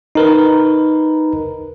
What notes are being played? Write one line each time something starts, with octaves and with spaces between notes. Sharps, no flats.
D#4 A#4 B4